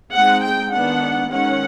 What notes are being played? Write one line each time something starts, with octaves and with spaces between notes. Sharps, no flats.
G#3 C4 D#4 F#5
G5
D#3 G#3 B3 D4 F#5
D#3 G#3 C#4 F#5